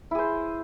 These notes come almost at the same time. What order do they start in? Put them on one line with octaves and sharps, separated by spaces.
E4 G#4 C5